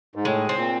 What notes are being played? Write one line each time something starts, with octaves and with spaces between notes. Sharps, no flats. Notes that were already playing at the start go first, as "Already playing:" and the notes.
G#2
A2 G#3
C4
A#2